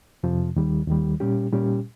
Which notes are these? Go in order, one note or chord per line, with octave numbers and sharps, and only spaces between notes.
F2 C3 F3
D#2 D#3 G3
D#2 D#3 G3
A#2 G3 C#4 G4
A#2 G3 C#4 G4